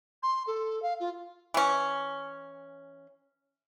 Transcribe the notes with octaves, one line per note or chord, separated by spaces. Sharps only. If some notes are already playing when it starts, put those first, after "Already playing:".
C6
A4
F5
F4
E3 C#4